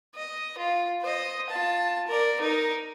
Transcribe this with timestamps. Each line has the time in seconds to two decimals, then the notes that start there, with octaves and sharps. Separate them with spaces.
0.15 D#5
0.58 F4
1.02 C5 D#5
1.49 F4 A5
2.07 A#4 D5
2.41 D#4 A#4